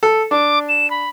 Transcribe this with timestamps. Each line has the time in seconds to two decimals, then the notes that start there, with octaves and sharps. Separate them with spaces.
0.03 A4
0.31 D4 D6
0.69 E7
0.91 B5